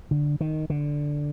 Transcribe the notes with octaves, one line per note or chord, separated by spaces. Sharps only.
D3
D#3
D3